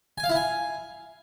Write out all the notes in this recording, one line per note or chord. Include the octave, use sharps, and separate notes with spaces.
G#5
F5
E4
G#5